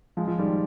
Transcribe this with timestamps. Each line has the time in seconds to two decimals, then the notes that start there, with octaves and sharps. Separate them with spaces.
0.17 F3 G#3
0.28 F3
0.39 D#3 G3